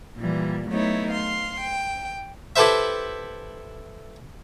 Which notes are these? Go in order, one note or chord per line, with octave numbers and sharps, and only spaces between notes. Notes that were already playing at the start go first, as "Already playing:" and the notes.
A#2 E3 G3
F#3 A3 B3 D#4 E4 C#5
F5 C6
G5
E4 G4 A4 B4 C5 E5